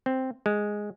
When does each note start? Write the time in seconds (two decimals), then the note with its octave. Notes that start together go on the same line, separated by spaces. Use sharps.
0.06 C4
0.46 G#3